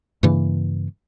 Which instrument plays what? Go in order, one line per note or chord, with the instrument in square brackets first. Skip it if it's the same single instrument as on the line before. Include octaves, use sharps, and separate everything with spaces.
[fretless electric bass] G2 C#3 E3 A#3